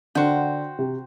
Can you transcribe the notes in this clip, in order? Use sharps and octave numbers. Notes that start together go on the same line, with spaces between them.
D3 F#4 C5 G5
C3